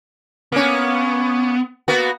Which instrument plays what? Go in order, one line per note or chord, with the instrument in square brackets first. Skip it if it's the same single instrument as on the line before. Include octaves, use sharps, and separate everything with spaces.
[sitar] A#3 C#4 [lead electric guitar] B3
[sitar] A#3 B3 F#4